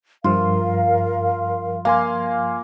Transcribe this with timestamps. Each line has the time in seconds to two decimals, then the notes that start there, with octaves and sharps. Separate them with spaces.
0.24 G2 F3 F4 A#4 F5
1.85 A#3 F5 G#5 C6